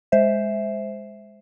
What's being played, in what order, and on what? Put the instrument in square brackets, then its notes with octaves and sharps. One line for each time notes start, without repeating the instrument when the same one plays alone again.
[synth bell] G#3 C5 E5